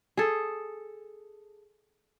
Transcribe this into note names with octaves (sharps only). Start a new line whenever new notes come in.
G#4 A4